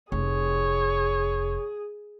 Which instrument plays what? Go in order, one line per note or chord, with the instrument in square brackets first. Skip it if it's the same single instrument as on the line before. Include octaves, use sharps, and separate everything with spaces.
[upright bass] F1 [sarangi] G#4 [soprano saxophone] C#5